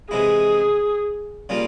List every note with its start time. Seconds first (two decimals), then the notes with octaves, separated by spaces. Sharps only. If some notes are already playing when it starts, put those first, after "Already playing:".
0.11 C3 E3 G#3 E4 G#4
1.49 C#3 G3 A#3 F4